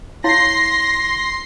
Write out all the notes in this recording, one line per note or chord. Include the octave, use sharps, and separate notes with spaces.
E4 C#5 F5 C6 A#6 C7